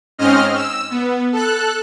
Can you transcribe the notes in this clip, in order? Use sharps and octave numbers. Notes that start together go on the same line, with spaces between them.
G#2 C4 C#4 D#5 F6
E6
B3
A4 F#6